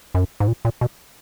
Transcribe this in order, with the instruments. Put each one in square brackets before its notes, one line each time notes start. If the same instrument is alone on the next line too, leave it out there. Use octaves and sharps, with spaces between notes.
[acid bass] F#2
G#2
A#2
A#2
B2